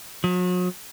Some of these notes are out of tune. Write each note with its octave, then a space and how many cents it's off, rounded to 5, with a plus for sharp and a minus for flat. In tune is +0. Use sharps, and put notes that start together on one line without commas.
F#3 -40